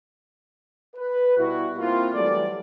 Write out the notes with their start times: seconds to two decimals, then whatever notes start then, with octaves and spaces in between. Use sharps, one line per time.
0.96 B4
1.37 B2 G3 E4 F#4
1.78 A#3 C4 E4 F4
2.14 E3 F#3 G3 A3 D5